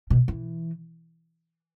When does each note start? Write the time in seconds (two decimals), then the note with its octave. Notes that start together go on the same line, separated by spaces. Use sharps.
0.10 B2
0.28 E3